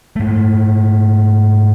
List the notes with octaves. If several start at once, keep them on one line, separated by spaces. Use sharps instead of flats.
G#2 A3